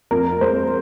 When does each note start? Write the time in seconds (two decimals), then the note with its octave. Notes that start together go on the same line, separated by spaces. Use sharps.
0.11 F2 A#4
0.41 G#3 C5